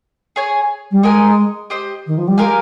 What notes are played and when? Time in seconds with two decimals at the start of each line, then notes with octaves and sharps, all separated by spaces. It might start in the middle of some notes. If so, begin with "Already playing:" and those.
0.36 G#4 C#5 G#5
0.91 G3
1.03 G#3 D#4 A#4 D#5 G#5
1.70 G4 C5 D#5
2.07 D#3
2.18 F3
2.28 G3
2.38 G#3 G4 A#4 F5 G#5